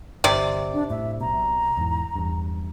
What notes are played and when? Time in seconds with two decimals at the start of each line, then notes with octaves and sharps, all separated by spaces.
0.24 G1 C3 D5
0.74 D4
0.90 A2 E5
1.21 B1 B2 A#5
1.78 E2 G#2 E3
2.16 E2 G2